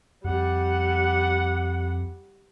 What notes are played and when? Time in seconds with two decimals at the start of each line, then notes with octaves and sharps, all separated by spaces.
0.24 F2 G3 F#5